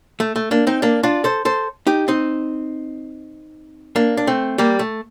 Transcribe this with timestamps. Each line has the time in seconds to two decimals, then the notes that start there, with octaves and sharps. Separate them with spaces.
0.20 A3
0.36 A3
0.51 A#3 D4
0.67 C4 D#4
0.82 A#3 D4
1.03 D4 F4
1.24 A4 C5
1.45 A4 C5
1.87 D#4 G4
2.08 C4 D#4
3.96 A#3 D4
4.17 D4
4.27 A3 C4
4.58 G3 A#3
4.79 A3